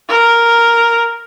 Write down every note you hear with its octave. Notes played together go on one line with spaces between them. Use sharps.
A#4